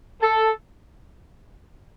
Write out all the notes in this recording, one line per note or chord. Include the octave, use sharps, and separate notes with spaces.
A4